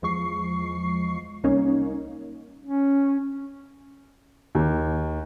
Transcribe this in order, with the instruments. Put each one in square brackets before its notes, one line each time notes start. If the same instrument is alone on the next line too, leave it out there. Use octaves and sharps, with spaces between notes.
[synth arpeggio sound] E2 F3 G#3 C#6 C7
C2 A#3 C#4 D#4 C#5
[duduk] C#4
[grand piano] D#2